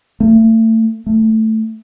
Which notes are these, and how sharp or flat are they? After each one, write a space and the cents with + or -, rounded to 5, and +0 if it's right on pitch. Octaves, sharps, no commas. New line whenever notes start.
A3 +30
A3 +5